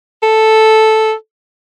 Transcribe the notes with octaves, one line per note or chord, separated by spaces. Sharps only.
A4